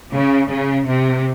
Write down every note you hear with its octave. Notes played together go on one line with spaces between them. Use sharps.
C#3
C#3
C3